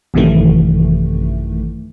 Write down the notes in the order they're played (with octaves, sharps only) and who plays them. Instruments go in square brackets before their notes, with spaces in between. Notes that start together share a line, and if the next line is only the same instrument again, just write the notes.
[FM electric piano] A1 F#2 C3 D#3 E3 A3